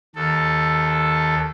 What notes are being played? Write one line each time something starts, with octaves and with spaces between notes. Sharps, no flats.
D#2 A4